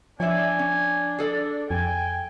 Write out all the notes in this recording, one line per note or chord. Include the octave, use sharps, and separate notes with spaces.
F3 D4 C#5 D5 E5 G#5
C#4
G#4 A4 D5
F2 G5 G#5